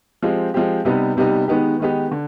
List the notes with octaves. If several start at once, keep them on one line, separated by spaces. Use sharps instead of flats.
F3 G#3 C4 G4
F3 G#3 C4 G4
C3 G3 B3 D#4 G4
C3 G3 B3 D#4 G4
D#3 G#3 B3 D#4 G4
D#3 G#3 B3 D#4 G4
D3